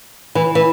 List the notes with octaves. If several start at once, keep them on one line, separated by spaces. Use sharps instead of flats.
E3
E3